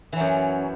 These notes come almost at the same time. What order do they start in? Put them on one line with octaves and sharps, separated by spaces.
E3 F#3 F#2